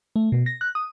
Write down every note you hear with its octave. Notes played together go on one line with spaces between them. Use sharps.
A3
B2
A#6
F#6
D#6